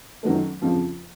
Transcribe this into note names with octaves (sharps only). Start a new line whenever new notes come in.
F#2 D#3 F#3 A3
F2 C#3 F3